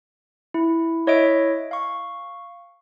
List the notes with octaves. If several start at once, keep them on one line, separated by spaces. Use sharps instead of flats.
E4
E4 C#5 D#5 E5 D7
F5 C#6